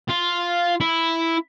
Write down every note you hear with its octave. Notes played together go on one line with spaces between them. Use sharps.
F4
E4